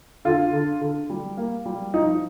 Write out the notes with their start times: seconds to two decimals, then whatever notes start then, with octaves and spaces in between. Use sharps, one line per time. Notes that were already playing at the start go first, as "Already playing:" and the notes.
0.25 D3 F4
0.53 D3
0.81 D3
1.10 G3
1.37 A#3
1.66 G3
1.94 F3 D#4